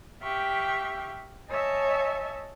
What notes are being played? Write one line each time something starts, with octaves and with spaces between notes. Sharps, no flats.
G4 E5 F5 G5 C#6
C#5 D#5 E5 G#5 A5